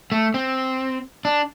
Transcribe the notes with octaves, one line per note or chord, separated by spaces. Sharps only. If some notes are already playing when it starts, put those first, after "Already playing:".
A3
C4
D4